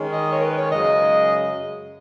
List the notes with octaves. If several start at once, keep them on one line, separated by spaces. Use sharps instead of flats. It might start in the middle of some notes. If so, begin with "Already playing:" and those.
Already playing: D#3 G#3 C#4
D#5
C#5
A#4
B4
C#5
F#2 C#3 G#3 D#5